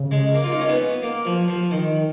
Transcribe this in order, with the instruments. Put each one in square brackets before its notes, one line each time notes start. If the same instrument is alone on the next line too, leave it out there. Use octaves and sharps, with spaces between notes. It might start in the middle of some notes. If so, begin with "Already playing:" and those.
Already playing: [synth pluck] C#3
[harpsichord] G#3
A#3
F4
D#4
C#4
B3
A#3
F3
F3
D#3